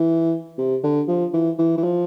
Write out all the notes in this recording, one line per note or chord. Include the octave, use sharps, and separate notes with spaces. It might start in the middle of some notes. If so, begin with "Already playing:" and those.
Already playing: E3
C3
D3
F3
E3
E3
E3
F3